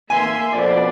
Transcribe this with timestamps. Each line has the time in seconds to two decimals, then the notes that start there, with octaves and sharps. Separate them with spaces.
0.10 A#3 E5 G#5 C6
0.52 F2 B2 D4 D5